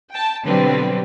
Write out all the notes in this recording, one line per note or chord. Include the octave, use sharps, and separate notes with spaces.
G5 A5
B2 D3 F#3 G3 C4 B4